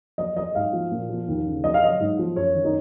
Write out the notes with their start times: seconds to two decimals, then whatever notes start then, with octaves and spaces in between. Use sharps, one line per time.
0.18 F#3 D#5
0.36 F#3 D#5
0.55 G#2 F5
0.73 F3
0.92 A#2
1.10 F3
1.28 D#2
1.46 C#3
1.64 F#3 D#5
1.74 F5
1.83 F#3 D#5
2.00 G#2
2.19 F3
2.36 F#2 C#5
2.55 D#3
2.65 D#4